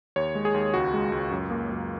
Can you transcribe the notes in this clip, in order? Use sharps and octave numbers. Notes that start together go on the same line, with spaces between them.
D#2 C#5
G#3
G#4
D#2
C#2 F#4
G#3
C#2
F#2
A#3
F#2